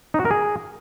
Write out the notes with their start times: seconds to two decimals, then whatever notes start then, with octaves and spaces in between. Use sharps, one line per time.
0.14 D#4
0.20 F#4
0.25 A#4
0.31 G#4